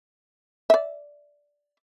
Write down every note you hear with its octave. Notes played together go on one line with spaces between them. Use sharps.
D5 E5